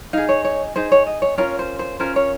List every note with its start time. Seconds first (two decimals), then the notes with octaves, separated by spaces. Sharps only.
0.13 D#4 G#4 F5
0.29 C#5
0.45 C#5
0.76 D#4 G#4 C5
0.92 C#5
1.07 D#5
1.22 C#5
1.38 C#4 F4 A#4 C#5
1.59 C5
1.79 C5
2.00 C#4 F4 A#4 C5
2.16 C#5